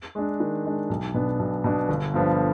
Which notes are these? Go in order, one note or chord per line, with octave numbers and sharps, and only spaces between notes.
G#3 D4
D#3
G#3 D4
B1
B2 B3 D4
B1
B2 B3 D4
G1
G2 D3 F3 B3